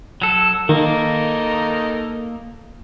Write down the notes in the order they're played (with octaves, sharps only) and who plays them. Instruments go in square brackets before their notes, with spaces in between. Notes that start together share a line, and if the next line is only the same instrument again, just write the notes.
[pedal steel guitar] F#3 A4
[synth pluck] D#3 [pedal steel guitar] A#3 [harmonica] D#4 A4 A#4